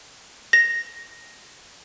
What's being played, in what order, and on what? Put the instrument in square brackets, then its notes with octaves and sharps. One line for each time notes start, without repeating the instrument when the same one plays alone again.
[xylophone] A#6